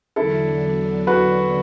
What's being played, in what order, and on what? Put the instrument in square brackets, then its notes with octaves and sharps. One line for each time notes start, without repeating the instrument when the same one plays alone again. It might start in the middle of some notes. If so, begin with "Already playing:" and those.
[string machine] E2 D3 F#3 D4 [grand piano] E4 A4
[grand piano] F#4 B4